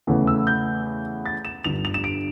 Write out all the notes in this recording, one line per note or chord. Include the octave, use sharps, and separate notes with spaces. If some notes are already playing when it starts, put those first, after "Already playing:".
E2 C#3 E3 A3
E6
G6
A6
E7
G1 G2 D3 F7
F7
E7
D7